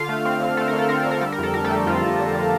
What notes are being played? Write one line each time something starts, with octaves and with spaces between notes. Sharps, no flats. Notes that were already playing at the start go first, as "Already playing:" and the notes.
Already playing: D3 F4 F5
A3
C4
D3
A3 A4
A#4
D3
A4
C4 A#4
A4
D3
A#4
G3 A4
A#4
F2 A4
F2 A#4
A3 A4
G3
F2 F3 F4
F2
D3
D3